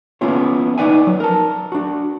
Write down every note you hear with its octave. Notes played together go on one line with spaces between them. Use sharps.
A#3 B3 C#4 E4 F4 C#5
D#4 F4 B4 D5 E5 G#5
F#3
A#4 A5
D4 F#4